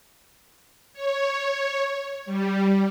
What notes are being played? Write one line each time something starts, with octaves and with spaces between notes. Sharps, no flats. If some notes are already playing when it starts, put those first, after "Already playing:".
C#5
G3